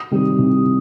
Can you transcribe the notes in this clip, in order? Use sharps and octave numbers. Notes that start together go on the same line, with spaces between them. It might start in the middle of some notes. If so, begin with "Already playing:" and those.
Already playing: D#6
C3 D#3 G3
C2